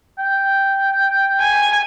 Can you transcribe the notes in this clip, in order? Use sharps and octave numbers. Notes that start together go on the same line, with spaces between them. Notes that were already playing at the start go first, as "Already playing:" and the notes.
G5
G#5